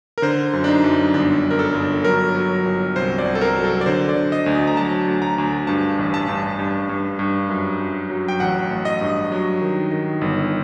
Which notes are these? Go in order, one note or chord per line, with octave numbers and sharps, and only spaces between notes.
A#4
D3 C5
F#2
D4
D#4
F#2
G1 D4
F#2
A#4
A4
G1
F#3 A#4
F#3
G1
C2 C5
D5
C2
A4
A#4
F#3
A4
D5
D3 C5
D5
D3
D#5
D2
A#5
F#3 A5
D2
A#5
D2
G2 A5
A1
A5
G2
G2
G2
G2
F#2
F#2
F#3
G5
A1 F#5
A1
D#5
G2
F#3
D#3
D#3
G1